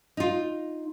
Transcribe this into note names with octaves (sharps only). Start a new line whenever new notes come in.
D#4 F4